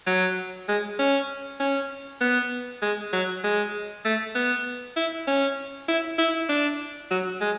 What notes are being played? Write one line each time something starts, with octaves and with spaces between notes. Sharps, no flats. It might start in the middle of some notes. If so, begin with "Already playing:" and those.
F#3
G#3
C#4
C#4
B3
G#3
F#3
G#3
A3
B3
E4
C#4
E4
E4
D4
F#3
G#3